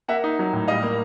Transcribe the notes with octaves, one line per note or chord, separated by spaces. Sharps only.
A#3 E5 F#5
D#4
F#3
A2
G3 D#5 F5
A#3